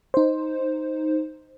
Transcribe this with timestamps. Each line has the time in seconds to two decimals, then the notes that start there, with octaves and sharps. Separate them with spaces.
0.14 D#4 C5